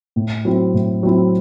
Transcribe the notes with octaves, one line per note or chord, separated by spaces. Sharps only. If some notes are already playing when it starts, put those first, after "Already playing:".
A2
F#3 C4 E4
A2
F#3 C4 E4